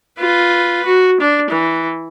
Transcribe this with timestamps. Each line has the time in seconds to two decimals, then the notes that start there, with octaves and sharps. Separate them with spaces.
0.19 F4 B4
0.85 F#4
1.20 D4
1.50 E3